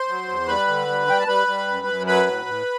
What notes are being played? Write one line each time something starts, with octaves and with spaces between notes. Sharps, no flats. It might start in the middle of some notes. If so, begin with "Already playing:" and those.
Already playing: C5 C6
F#3
E2
G3 B4 B5
D3
G3
G3 G5
A5
G3 B4 B5
G3
F#2
F#2
F#3 B4 B5
A2
A2